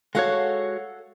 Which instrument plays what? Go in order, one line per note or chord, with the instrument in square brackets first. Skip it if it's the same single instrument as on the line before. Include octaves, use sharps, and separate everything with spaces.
[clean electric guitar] G#3 F#4 C#5 [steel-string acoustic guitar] A4 F5 F#5